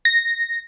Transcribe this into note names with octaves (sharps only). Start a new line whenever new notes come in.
A#6